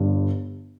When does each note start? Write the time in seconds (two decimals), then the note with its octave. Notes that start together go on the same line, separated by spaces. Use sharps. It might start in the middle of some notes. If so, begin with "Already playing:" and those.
Already playing: G1 G2